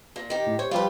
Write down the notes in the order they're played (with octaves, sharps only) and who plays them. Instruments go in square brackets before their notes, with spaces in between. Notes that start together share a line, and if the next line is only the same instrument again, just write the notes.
[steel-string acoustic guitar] A#2
D#3 G4
[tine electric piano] A2
[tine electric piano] C5 [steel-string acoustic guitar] C#5
[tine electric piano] F3 G3 [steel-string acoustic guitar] F4 G4 B4